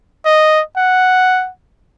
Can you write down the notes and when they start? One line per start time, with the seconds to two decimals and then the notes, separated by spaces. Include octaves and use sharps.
0.25 D#5
0.77 F#5